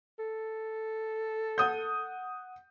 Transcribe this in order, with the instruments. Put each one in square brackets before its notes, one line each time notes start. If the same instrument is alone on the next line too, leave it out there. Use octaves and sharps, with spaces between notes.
[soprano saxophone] A4
[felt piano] F#5 D#6 G6